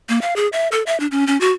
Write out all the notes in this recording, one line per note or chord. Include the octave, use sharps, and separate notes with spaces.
A#3
F5
G#4
E5
A4
E5
D4
C#4
C#4
F#4